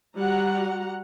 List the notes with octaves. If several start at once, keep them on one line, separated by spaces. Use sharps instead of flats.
G3 F#4 F#5 A#5